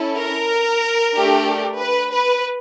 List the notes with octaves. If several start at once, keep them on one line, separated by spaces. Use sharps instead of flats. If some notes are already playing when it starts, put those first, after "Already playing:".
Already playing: C#4 E4 A4
A#4
A3 D4 G4
B4
B4